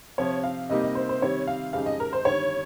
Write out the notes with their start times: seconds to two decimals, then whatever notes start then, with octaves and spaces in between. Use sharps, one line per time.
0.18 C3 F3 C4 C#5
0.43 F5
0.69 C3 G3 A#3 D#4 G4 D#5
0.82 D#5
0.95 C5
1.09 C5
1.21 C3 D#3 G3 C#5
1.47 F5
1.73 F2 C#3 G#3 D#4 G4 F5
1.86 D#5
2.00 A#4
2.13 C5
2.25 G1 G2 D#3 G3 C#5